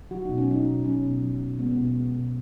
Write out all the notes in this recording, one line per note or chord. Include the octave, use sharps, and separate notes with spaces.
F#3 F#4
B2 D#4
C#4
F#3 D#4
B2
F#3 C#4
B2
F#3
B2
G#3 B3
B3
B2
B3
G#3
B2